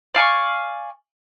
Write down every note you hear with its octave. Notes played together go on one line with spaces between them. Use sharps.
D5 F5 G#5 C#6